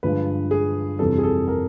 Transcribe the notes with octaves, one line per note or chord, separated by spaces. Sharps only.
G2 D3 F3 G#3 B4
G#4
F2 C3 E3 G3 A4
G#4
A4
A#4